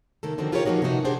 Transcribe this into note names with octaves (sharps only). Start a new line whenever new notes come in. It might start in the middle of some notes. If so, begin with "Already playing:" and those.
C3 D#3 A#3 A4
D3 D#3 F3 A#3 C4 F#4
F4 G4 G#4 A#4 B4 C#5
E3 F3 G3 A#3 D#4 F#4
C3 D#3 B3 D#4 F#4
D4 G4 G#4 C5 D5